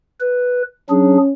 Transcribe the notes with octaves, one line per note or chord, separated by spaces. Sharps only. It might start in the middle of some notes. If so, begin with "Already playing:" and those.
B4
F#3 C#4 D4 G#4